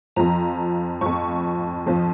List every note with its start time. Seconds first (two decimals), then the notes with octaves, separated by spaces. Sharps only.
0.16 F2 F3 A#5
1.01 F2 F3 C#6
1.87 F2 F3